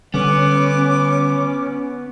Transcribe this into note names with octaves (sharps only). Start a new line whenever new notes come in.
D3 G3 B3 C#4 D6